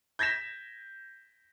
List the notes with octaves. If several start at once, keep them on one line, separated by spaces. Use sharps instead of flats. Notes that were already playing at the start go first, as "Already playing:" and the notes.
G6 G#6 A#6 B6 E7